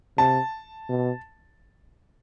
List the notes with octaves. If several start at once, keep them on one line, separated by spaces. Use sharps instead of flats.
C3 A5
B2